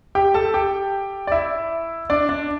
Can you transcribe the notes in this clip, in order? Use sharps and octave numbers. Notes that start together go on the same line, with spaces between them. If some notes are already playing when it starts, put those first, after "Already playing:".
G4 G5
A4 A5
G4 G5
D5
E4 E5
D4 D5
D4 D5